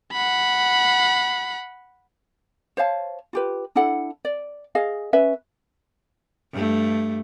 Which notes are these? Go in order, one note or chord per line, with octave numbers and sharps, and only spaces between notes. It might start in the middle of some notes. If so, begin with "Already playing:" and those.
F#5 B5
C5 C#5 F5 A5
F4 G4 B4
D4 E4 A4 F#5
D5
G#4 D#5 F5
C#4 B4 E5
G2 A3